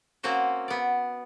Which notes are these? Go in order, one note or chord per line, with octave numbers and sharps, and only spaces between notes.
A#3 C4 C#4 F#4 C5
B3 D5